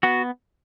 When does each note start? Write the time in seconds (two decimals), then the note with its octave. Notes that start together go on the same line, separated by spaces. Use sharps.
0.03 B3 F#4